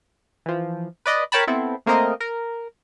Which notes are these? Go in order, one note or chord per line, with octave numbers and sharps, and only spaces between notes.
E3 F3
B4 D5 D#5
A#4 C#5 G5 A5 B5
B3 C4 E4 A4
A3 A#3 C4 A#4 D#5
A#4